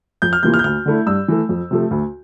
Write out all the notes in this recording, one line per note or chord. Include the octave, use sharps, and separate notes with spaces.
F2 G6
F6
C3 E3 A#3 F4 G6
F6
G6
D2 F6
D3 A3 E4
G2 E6
E3 A3
F2
C3 F3 A3
D2